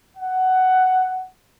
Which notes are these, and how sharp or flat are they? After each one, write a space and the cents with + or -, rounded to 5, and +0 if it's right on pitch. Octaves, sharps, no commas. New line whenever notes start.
F#5 +10